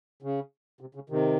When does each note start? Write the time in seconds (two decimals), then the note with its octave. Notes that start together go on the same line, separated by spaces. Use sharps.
0.22 C#3
0.81 C3
0.95 C#3
1.09 C3 D#3